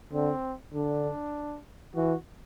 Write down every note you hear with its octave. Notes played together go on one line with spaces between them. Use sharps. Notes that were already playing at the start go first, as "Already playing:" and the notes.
D3 C4
D3 D4
E3 F#4